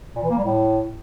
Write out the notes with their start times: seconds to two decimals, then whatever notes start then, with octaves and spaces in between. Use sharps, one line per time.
0.15 A#2
0.23 E3
0.30 A#3
0.38 G3
0.45 A2